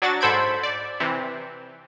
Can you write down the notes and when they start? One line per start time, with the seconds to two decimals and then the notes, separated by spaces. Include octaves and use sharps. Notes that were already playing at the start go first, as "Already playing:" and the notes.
0.02 F#3 D4 F#4 A6
0.21 G#2 A4 C5 B5 G#6 D7
0.63 D5
1.00 C3 E3